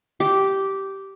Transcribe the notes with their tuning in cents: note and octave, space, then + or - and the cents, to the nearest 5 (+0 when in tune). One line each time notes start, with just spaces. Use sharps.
G4 -10